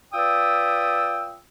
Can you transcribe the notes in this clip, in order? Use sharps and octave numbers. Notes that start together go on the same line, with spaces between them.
F4 B4 D5 G5 D#6 E6